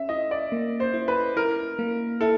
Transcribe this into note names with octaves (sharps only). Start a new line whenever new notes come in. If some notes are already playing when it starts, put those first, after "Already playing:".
Already playing: C#4 E5
E4 D#5
D5
A#3
C5
E4
B4
E4 A#4
A#3
E4 A4